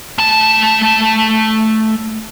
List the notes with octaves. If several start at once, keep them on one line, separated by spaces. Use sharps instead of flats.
A3 A5